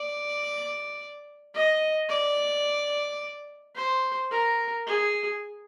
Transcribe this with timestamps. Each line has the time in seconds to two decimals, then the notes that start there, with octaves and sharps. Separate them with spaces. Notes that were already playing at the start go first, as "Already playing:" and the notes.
Already playing: D5
1.55 D#5
2.09 D5
3.75 C5
4.31 A#4
4.87 G#4